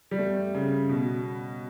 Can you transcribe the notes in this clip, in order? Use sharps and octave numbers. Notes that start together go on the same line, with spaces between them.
G3
A3
C#3
B2